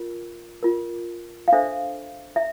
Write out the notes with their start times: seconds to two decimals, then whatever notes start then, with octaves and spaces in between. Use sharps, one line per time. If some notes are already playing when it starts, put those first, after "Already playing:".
Already playing: F4 A#4
0.63 F4 A#4
1.48 F5
1.52 D4 A4 C5 E5
2.36 E5